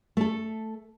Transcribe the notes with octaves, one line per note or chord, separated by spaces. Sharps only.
A3 A4